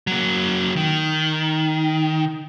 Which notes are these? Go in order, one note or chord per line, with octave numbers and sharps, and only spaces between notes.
F#3 A#3
D#3